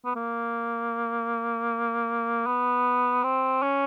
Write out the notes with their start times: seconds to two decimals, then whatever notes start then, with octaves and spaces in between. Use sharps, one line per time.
0.05 B3
0.15 A#3
2.46 B3
3.23 C4
3.62 C#4